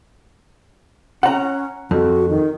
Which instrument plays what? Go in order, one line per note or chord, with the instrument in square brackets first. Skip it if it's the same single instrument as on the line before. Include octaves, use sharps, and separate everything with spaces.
[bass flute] C#4 [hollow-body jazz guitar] F#5 A#5
[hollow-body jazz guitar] F2 [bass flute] F#4
[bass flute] D#3